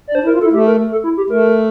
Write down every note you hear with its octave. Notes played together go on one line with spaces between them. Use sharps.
D5
D4 C5
E4
A#4
F4
A4
E4
A3 G4
A#4
A4
E4
G4
A3 A#4